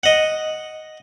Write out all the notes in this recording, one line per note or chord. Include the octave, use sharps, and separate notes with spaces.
D#5 F#5